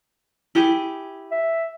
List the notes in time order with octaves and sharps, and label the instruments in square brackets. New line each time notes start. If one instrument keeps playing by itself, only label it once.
[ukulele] E4 G4 G#4
[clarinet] E5